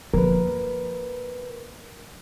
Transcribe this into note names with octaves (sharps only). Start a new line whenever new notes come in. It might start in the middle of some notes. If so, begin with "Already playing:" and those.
F3 A#3 A#4 B4